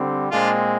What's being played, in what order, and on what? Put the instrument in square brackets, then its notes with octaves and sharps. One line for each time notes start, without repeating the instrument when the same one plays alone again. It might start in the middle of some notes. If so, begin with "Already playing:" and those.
Already playing: [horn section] D3 G3 C4
A#2 G#3 C4 D4 F4